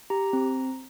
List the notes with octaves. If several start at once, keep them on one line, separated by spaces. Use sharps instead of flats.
G4 A#5
C4